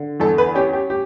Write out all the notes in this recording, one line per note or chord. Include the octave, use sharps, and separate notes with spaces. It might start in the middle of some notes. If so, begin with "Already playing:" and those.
Already playing: D3
E2 A4
B4
C#4 G4
G4
G4